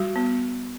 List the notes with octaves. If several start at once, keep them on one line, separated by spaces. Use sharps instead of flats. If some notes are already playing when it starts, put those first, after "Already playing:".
Already playing: G3 F#4
B3